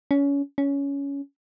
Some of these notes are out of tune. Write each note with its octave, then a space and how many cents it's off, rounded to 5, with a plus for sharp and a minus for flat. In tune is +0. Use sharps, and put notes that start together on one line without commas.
C#4 +25
C#4 +15